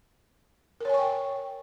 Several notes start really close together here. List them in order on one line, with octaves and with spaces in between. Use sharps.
A#4 C#5 G#5 C#6 G5